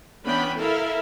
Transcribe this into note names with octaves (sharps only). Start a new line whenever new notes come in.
E3 B3 C#4 D4 G5 B5
E4 A4 A#4 E5 F5